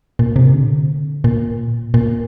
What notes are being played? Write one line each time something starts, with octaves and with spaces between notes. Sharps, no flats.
A#2
C3
D3
A#2
A#2